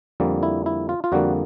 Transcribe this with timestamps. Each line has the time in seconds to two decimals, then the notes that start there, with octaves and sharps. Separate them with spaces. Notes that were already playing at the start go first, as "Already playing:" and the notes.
0.20 F2 D3 G3 A#3
0.43 E4
0.66 E4
0.89 F4
1.04 F4
1.12 F2 D3 G3 A#3 F#4